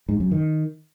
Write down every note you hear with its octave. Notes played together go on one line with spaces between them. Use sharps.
G#2
F#2
D#3